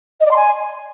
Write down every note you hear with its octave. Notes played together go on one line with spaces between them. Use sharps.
D#5
D5
C6
G#5